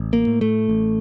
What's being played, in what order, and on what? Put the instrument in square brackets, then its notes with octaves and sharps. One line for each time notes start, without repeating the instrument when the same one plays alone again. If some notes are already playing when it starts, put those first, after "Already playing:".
Already playing: [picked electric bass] A1
A#3
A2
A3
A1